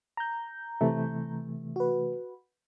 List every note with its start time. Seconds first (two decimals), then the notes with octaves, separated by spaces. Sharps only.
0.17 A#5 G6
0.81 C3 E3 A3
1.76 F#4 B4